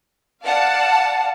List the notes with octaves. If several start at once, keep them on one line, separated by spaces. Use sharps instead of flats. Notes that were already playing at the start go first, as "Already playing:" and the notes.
D5 F5 F#5 A5